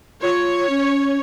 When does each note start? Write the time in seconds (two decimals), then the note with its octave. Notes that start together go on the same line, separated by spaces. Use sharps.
0.21 F4 C#5
0.69 C#4